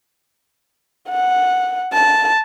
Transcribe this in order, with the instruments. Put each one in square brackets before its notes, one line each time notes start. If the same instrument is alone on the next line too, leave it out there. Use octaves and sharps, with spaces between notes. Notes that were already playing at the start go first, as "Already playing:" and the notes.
[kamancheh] F#5
A5